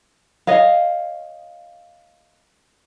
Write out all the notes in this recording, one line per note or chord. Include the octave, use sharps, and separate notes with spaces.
C#5 D#5 F5